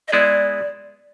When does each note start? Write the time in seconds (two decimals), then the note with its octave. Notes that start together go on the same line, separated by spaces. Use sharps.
0.08 D#5
0.12 G#3 B3 E4 G#4 D5